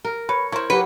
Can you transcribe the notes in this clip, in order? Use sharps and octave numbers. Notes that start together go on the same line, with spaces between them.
A#4
B4 C#5
E4 A#4 C5 C#5
F#3 G4 B4